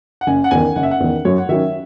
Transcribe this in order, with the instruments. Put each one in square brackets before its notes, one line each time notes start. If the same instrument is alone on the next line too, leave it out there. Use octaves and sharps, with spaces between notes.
[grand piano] F#5
[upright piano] F#1 [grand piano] G#5
[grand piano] F#5
[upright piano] E2 D#3 [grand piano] G#5
[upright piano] F#1 [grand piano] F#5
[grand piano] E5
F#5
[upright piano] E2 D#3
[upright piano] F#2 [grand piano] C#5
[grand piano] F#5
[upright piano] D#3 F#3 C#4 [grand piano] E5